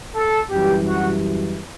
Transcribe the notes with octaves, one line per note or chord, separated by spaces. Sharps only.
A4
F#2 E3 G3 G4
F#4